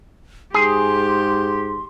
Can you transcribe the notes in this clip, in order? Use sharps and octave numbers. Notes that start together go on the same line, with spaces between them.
G#2 G4 G#4 C6